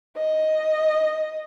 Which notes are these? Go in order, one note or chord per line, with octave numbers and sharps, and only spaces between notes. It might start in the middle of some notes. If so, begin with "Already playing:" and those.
D#5